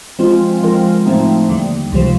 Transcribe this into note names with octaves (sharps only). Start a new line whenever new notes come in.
F3 G#3 C4 F4
F3 G#3 C4 F4 A#4
A2 F3 A3 C4 D#4
D#2 D3 G3
C#2 C3 F3